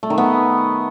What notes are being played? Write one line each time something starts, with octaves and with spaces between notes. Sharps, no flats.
A3
D#3
B3